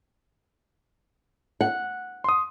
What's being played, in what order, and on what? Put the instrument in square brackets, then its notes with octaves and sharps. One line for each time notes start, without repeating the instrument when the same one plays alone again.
[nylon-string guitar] F#5
[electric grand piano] C6 D#6